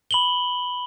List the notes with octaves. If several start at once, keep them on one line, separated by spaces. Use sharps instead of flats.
B5 F#7 G7